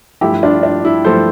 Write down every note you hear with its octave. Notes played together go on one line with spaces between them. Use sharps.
G2 F3 A3 E4 G4
D4 F4
D4
E4
G2 F3 A3 A4 C5